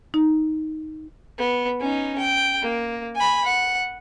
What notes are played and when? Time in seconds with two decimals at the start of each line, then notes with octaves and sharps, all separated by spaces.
0.14 D#4
1.38 B3
1.80 C#4 D#4
2.18 G5
2.62 A#3
3.16 G#5 B5
3.45 F#5